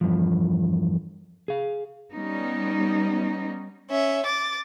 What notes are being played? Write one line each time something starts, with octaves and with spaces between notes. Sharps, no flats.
E2 G2 F3
G#4 F5
G3 B3 C#4 D#4
C#4 E5
D6 A6